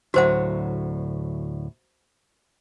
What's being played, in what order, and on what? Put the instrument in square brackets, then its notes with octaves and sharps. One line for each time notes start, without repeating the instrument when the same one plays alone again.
[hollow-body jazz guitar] D2 A2 F#3 [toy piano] F#4 C5 F#5